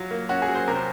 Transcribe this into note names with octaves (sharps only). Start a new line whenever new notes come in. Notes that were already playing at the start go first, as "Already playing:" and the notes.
Already playing: F#3 F4
A#3
C#4 F#4
G#4
F#3
C5
C3 A#4
C5